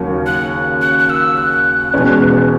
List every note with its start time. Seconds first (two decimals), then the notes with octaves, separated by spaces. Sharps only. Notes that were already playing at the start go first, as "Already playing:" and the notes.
Already playing: D#2 C#3 F#3 A#3 C#4
0.26 F#6
0.82 F#6
0.99 F#6
1.10 E6
1.37 F#6
1.94 E1 E2 B2 G#3 C#4